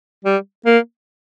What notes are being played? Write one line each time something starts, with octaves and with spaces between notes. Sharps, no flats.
G3
A#3